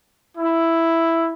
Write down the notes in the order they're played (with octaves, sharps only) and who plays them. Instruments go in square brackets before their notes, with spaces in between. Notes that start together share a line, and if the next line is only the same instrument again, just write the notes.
[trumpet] E4